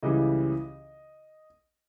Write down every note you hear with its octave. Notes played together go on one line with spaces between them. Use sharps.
C#2 C#3 E3 G3 D#5